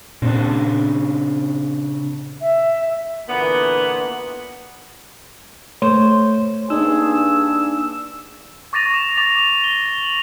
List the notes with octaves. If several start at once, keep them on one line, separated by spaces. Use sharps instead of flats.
A#2 C#3 C4 D4
E5
A#2 D3 E3 B3
A3 C5 C#5
G2 A#3 D4 D#4 G#4 E6
C#6 D6 A6 A#6 D#7 F7
E7
D6 A6 F7
E7 G7
F#7